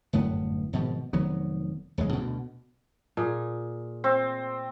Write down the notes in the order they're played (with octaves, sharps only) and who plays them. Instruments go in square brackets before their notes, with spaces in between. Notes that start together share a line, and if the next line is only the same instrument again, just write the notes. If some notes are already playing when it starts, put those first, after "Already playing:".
[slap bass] G1 F#2 A2 B3
G#1 B2 F3
F1 D#3 F#3 B3
D#1 F#2 G#3
D2 B2
[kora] A#2 G#4
[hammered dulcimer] C4